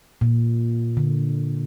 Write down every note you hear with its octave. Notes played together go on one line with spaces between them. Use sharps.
A#2
D3